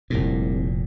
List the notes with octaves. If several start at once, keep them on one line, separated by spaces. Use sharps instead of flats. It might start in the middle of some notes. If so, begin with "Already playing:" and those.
F1 C2 A#2